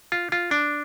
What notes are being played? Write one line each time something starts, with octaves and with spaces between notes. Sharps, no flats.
F4
F4
D4